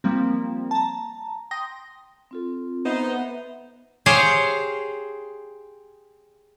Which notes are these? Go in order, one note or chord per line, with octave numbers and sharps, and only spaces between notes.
F3 G3 A#3 C4
A5 A#5
G5 C6 D#6 A#6
C4 F4 A4
B3 D#4 C5 E5
G4 G#4 C5 C#5 F5